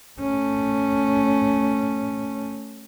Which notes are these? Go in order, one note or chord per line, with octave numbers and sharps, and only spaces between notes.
A3 C#4